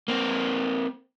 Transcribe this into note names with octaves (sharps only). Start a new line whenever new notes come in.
A#3 C4